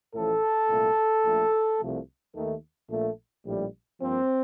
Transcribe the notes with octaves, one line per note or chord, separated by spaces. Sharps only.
A1 A2 F3 A4
C2 A#2 A3
A#1 A#2 A3
C2 C3 F3 A3
D#2 D#3 A3
A#1 A#2 A3
A#1 A2 G3
G2 F3 A#3 C4